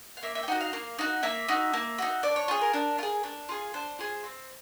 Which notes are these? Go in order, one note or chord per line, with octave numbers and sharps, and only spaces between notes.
F5
A#3 E5
E5
G5
D#4 F#4 F#5
F5
A#3
D#4 F#4
A#3 E5
D#4 F#4
A#3
D#4 F#4
D4 D5
C#5
F4 G#4
A#4
D4
F4
G#4
D4
F4 G#4
D4 C5
F4 G#4
C4